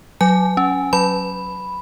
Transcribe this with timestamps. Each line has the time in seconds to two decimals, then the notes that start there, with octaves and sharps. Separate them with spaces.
0.21 F#3 G#5
0.57 C#4
0.93 F#3 B5